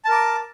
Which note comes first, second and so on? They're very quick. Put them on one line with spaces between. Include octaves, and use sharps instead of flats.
A5 A#4 D6